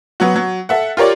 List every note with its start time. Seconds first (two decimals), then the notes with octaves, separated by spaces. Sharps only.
0.20 F#3 B3 F#4
0.36 F#3
0.69 A4 E5 F#5
0.97 F4 G4 A#4 C#5 D5